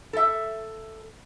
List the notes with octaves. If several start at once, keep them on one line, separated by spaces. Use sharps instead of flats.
A4 E5